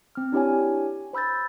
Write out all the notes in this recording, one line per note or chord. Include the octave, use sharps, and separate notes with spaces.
C4 F6
D4 E4 G4 C#5 G#5
C5 B5 E6 G6 A6